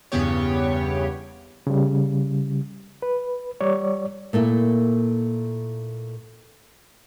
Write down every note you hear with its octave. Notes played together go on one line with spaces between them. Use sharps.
E2 G2 C#3 B3 G4 C#5
C#3 G3
B4
G3 C#5 D5
A#2 A3 A#3 E4